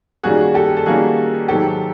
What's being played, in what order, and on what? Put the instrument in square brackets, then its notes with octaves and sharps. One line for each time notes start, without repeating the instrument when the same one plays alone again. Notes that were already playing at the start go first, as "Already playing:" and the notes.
[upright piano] D#3 G3 A#3 C#4 F#4 G#4
G4 A4
A4
D#3 G3 A#3 C#4 F#4 G#4
G#2 D#3 F#3 G4 A4